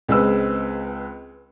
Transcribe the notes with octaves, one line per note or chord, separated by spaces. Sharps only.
C#2 G#3 C4 B4 E6